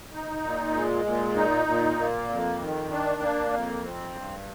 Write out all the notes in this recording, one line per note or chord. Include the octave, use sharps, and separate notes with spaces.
D#4
A#2
G#3
A#2
D#4
A#2
A#3
F2
D#3
D4
A#3
F2
C4
G2